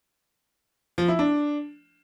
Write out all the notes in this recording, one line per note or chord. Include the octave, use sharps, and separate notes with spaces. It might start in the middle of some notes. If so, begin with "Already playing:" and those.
F3
E4
D4